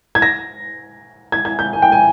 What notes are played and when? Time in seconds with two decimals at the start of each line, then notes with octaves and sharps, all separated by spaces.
0.15 G#6
0.22 A#6
1.32 G#6
1.45 G#6
1.59 G6
1.73 G#5
1.82 G5
1.92 G#5